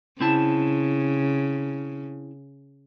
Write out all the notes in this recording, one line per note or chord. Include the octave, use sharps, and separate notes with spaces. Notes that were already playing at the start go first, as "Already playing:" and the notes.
C#3 C4 E4 A5